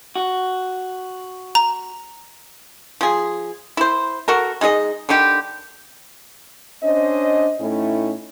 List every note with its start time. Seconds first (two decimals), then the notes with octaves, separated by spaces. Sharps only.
0.16 F#4
1.55 A#5
3.01 F3 G#4
3.77 E4 C5
4.28 F#4 A4 A#4
4.61 G#3 D#4 G#4 D#5
5.09 D3 D#3 G3 G4
6.83 C#4 D4 C5 D#5
7.61 A2 A3 C#4 D#4 E4